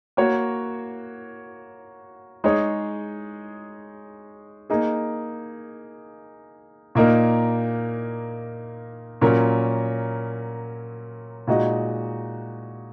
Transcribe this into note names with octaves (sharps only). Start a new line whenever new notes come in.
A#3 F#4 C#5
G#3 D#4 G#4 C#5
A#3 D#4 G#4
A#2 A#3 D#4 A#4
A#2 F#3 C#4 A#4
A#2 G#3 D#4 F#4 D#5